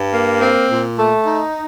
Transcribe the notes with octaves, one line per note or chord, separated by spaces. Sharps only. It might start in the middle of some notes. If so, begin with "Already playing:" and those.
Already playing: G2
A#3
C4
A#2
A3
D#4